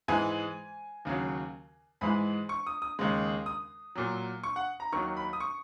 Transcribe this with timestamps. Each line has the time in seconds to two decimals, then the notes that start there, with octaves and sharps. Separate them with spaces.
0.08 G#2 E3 G#3 G#5
1.05 D#2 C#3 F#3
2.01 G#2 E3 G#3 B5
2.49 C#6
2.67 D#6
2.82 D#6
2.99 D#2 C#3 G#3
3.46 D#6
3.95 A#2 F#3
4.44 C#6
4.56 F#5
4.80 A#5
4.93 D#2 D#3 F#3 C#6
5.17 B5
5.33 D#6
5.40 C#6